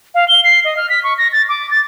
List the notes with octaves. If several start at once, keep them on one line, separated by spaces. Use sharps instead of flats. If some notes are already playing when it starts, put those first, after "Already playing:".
F5
G7
C7
D#5
F6
B6
C#6
A#6
A6
D6
A6